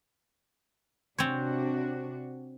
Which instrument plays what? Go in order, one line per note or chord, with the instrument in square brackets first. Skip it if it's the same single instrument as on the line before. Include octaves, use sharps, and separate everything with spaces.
[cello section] C3 D4 F#4 [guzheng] C4 C#5